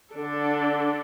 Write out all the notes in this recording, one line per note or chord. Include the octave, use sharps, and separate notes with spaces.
D3 D4 A4